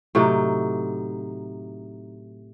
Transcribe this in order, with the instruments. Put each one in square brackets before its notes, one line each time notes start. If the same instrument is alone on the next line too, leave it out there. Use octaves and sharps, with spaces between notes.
[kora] A2 C3 F#3 D#4